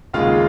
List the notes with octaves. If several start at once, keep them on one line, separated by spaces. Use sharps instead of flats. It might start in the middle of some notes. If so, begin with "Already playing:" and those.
D#2 C#3 G#3 F4 F5